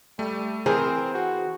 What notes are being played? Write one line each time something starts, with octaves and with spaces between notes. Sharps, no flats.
G3 A3
E3 C4 G#4 A#4 C5
F#4